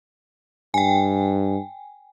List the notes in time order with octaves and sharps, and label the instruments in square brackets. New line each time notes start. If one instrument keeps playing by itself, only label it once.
[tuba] G2 [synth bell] G5 G#5